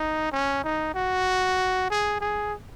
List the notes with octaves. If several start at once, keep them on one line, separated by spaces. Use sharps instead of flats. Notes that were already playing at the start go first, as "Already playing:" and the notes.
Already playing: D#4
C#4
D#4
F#4
G#4
G#4